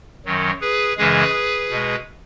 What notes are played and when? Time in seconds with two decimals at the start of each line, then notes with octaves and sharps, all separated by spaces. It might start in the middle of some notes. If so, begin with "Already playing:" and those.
0.25 F#2 D#3 F#3
0.61 G#4 B4
0.97 F#2 C#3 E3 G#3 G#4 B4
1.70 B2 G#3